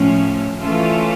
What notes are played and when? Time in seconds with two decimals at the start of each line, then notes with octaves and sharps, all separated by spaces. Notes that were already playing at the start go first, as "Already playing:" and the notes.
Already playing: A2 F3 A3 C#4
0.60 E3 A3 C#4 F4 A4